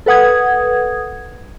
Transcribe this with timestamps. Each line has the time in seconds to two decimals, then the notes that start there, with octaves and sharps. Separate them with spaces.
0.06 A4 B4 F#5 D#6 G#6